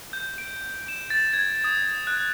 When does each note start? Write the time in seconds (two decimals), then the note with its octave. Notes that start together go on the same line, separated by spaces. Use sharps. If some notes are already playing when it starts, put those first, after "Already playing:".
0.13 G6
0.38 D7
0.88 E7
1.10 A6
1.33 G#6
1.64 D#6
2.07 F#6